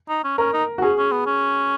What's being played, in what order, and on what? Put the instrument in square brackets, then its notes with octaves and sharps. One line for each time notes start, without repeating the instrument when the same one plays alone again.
[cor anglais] D#4
C#4
[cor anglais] C#4 [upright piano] A#4
[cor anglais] D#4
[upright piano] F#4
[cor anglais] C#4 [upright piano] G#4
[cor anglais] C#4
B3
C#4